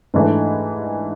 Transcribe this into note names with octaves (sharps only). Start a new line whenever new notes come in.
G#2 E3 A3 D4